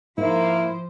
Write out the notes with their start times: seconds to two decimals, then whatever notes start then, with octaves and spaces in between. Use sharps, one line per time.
0.18 G#2 F3 A#3 E4 C5